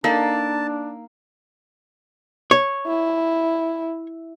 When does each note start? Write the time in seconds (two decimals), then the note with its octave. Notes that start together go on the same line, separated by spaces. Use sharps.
0.04 A#3 D4 D#4 A4 D5 A5
2.51 C#5
2.87 E4